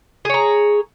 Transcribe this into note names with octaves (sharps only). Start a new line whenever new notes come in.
G#4 C#5 A#5